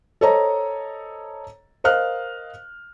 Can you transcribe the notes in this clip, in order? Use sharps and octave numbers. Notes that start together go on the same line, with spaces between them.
A4 C5 C#5 D#5 A#5
A#4 C5 D#5 F5 F6 F#6